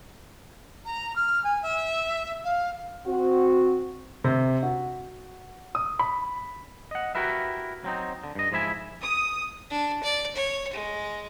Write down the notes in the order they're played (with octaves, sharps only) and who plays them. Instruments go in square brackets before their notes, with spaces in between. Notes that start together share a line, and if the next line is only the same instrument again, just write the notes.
[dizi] A#5
F6
G#5
E5
F5
[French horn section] C4 F#4
[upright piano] C3
F#4
D#6
B5
[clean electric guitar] D#5 F#5
E4 F#4 G4 A#4 B4 E5
F#3 C4 D#4
D3
G2 D#5
G#2 F3 E4 E5 G#5
[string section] D#6
[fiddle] D4
D5
C#5
G#3